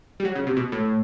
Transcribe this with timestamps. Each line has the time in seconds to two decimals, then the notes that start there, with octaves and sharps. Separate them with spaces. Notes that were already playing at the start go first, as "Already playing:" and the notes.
0.20 G3
0.25 F#3
0.35 C#3
0.47 C3
0.57 B2
0.72 A2